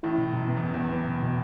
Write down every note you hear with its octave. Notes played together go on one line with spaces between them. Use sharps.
A1 A2 E4
B2
F#2 B2
F#2 B3
E2
B3
E2 B3
B3
B2
B2